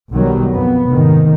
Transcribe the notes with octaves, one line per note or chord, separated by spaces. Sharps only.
B1 D#3 F#3 G3
F2 B3
F1 G#2 D#3